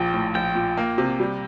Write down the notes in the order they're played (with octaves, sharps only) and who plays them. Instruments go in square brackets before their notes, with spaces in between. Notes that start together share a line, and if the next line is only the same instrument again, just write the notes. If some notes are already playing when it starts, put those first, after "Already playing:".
Already playing: [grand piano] A#1 A#2 [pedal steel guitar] G5
[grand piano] A2
[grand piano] A#1 [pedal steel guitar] G5
[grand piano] A#2
A#3
C3
G3